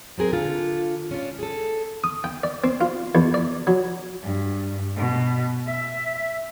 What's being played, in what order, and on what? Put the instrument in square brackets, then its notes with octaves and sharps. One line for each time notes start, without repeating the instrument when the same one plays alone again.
[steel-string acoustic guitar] F#3 C4 G#4 A#4
D3 F4
C#4 D4 F4 D5
G#4 A4
[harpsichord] D#6
G5
D5
C4
F4
E2
D5
F#3
[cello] G2
B2
E5